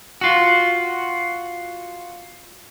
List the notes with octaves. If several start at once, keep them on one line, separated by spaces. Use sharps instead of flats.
F4 F#4